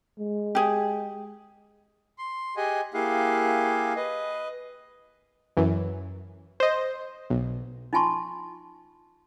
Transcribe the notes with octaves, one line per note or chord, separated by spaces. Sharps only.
G#3
G4 G#4
C6
G4 G#4 D#5 F#5 G#5
A#3 E4 G4 G#4 F5 F#5
B4 D#5
F#2 E3
C5 D#5
B1
D#4 F4 G#5 A5 C6 C#6